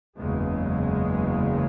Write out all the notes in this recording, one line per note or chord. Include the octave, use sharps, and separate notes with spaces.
F#1 E2 C#3 G#3